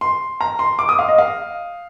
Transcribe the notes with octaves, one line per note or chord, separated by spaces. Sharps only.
C6
A#5
C6
D6
D#6
F5
D#5
F5